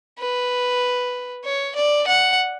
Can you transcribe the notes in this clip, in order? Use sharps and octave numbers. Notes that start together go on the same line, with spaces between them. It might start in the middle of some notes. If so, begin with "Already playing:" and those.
B4
C#5
D5
F#5